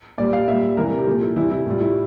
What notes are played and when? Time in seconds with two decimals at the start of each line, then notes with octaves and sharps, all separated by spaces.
0.18 A#2 G3 D5
0.33 F5
0.48 A#2 G3 E5
0.77 C3 E3 G3 A#4
0.99 G4
1.07 A#2 F3 A4
1.21 E4
1.36 C3 E3 G3 E4
1.51 E4
1.66 A2 G3 F4
1.81 E4